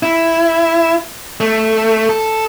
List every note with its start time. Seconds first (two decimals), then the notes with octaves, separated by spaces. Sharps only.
0.03 E4
1.41 A3
2.09 A4